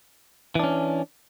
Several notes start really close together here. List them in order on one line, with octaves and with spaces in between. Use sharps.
E3 D4 C#4